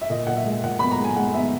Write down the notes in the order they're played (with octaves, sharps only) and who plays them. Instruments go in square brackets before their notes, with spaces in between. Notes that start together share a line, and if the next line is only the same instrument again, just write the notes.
[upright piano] E5
A#2 D#5
A#2 F#5
E5
G#3
A#2 F#5
B3 B5
A#5
G#3
G#5
G#3 F#5
B3 E5